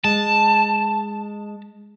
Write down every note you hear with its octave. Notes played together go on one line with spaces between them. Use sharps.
G#3 A5